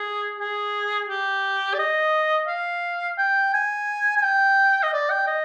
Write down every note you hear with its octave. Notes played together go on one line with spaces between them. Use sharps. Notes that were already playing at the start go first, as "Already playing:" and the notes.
Already playing: G#4
G#4
G4
D5
D#5
F5
G5
G#5
G#5
G5
D#5
D5
G5
D#5